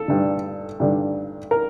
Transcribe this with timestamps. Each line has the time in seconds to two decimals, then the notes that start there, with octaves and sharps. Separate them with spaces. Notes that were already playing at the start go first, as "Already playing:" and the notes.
Already playing: A4
0.08 G2 D3
0.80 G2 D3
1.51 A#4